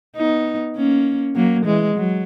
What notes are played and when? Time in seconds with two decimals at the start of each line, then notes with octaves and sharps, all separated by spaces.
0.16 B3 D#4
0.76 A#3 C#4
1.36 F#3 A#3
1.66 E3 G#3
1.95 F#3